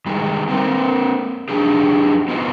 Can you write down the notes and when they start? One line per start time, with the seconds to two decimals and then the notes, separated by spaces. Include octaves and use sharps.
0.06 D#3 G3 G#3
0.48 A#3 C4 A#4 C5
1.49 F2 F#3 D4 G4 G#4
2.28 B3 D#4 F4 F#4 C5